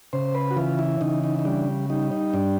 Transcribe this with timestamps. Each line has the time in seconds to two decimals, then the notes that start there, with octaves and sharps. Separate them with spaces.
0.13 C#3 C5
0.35 B4
0.51 F#4
0.57 E3 F4
0.79 E4
1.01 C#3 D#4
1.24 D#4
1.39 D#4
1.45 G3 D4
1.90 G3 D#4
2.12 D#4
2.34 G2 D4